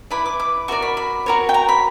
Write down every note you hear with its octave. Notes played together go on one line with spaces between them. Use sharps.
E4 B4 D5 B5
D6
D6
F#4 A#4 D5 C#6
B5
B5
F#4 A#4 C#5
G5
A#5
B5